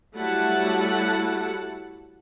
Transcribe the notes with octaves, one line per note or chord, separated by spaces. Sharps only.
F#3 G3 A3 E4 F#5 A5